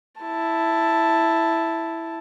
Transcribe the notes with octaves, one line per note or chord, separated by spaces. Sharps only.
E4 A5